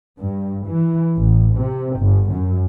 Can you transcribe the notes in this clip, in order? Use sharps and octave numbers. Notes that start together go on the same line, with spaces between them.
G2
E3
A1
C3
G1
F#2